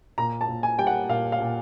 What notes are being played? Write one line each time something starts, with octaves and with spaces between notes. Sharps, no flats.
A#2 A#5
A5
A#2
G#5
G3 G5
F#5
A#2 F5
F5
A#2